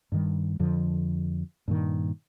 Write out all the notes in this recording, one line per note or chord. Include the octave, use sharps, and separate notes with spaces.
G2 D#3 G3
F2 D3 F3
G2 A#2 D#3